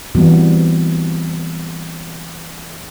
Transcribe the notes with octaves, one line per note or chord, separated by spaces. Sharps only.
E3 G3 B3 C4 F#4